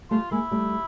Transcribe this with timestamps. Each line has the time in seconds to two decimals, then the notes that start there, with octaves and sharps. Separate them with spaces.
0.11 G3 A3 F4
0.31 G#3 A#3 E4
0.51 G3 A3